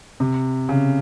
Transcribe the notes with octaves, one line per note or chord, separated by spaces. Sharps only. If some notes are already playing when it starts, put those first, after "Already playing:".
C3
C#3